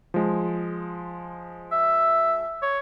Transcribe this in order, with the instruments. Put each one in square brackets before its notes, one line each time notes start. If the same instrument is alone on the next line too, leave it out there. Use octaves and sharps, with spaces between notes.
[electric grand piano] F3 G#3
[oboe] E5
C#5